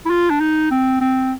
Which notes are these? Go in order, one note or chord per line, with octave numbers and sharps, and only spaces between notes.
E4
F4
D4
D#4
C4
C4